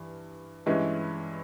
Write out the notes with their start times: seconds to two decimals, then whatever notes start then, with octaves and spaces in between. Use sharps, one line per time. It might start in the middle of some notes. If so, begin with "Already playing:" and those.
Already playing: G2 E3
0.66 G2 E3 G#3 C#4 E4